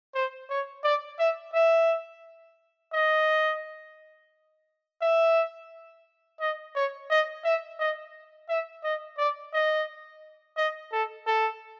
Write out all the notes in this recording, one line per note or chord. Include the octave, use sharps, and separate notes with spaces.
C5
C#5
D5
E5
E5
D#5
E5
D#5
C#5
D#5
E5
D#5
E5
D#5
D5
D#5
D#5
A4
A4